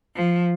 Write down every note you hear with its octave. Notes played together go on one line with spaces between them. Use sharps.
F3